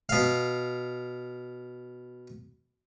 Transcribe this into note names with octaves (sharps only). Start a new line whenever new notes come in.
B2 F5